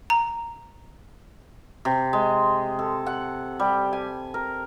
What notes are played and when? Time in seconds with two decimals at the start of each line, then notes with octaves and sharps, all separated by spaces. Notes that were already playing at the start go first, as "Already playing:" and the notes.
0.10 A#5
1.85 C3
2.13 G#3
2.79 A4
3.06 F#5
3.60 G3
3.93 G#5
4.34 A#4